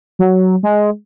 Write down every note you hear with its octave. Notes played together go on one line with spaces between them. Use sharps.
F#3
G#3